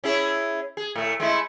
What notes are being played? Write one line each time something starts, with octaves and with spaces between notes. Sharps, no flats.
C#4 E4 G#4
G#4
A2 A3
G#3 A3 E4